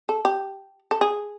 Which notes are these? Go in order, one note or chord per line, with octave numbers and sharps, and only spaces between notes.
A4
G4
A4
G#4